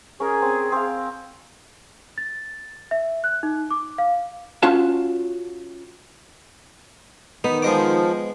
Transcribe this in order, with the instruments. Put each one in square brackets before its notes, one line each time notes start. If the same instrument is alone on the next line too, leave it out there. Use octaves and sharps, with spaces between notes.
[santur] C#4 A#4 [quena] G#4
[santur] C4
C4 F5
[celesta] A6
E5
F#6
D#4
D6
F5
[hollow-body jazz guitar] C#4 F4 F#4 F5 A5
[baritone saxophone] D#3 [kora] B3 [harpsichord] D#4
[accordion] F3 [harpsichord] G#3 D#5 D6